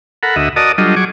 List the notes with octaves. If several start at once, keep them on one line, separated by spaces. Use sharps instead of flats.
A4 A#4 F#5 B5
D2 F#4 D#5 E5
F#4 A#4 D5 D#5 A5 D#6
F#3 G3 D4 F4 A4 D#5
F#3 G#4 C#6 D6